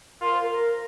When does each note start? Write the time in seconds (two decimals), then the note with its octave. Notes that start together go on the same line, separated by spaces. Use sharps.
0.21 F4 A#4 D5
0.31 C5
0.40 A#4
0.51 A#4